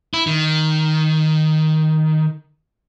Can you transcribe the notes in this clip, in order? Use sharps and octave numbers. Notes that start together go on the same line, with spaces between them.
E4
D#3